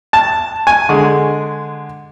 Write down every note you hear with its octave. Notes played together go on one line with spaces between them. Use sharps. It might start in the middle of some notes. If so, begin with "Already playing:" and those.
A5
G#5
D3 G#3